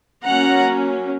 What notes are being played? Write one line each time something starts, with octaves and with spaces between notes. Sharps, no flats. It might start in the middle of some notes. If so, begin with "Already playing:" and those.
F#3 A#3 C#4 F#5 A#5